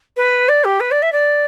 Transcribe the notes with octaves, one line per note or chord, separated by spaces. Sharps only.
B4
D5
G4
B4
D5
E5
D5